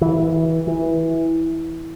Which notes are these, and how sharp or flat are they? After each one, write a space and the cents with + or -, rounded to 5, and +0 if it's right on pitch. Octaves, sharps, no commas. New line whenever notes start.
E3 -20
E3 -10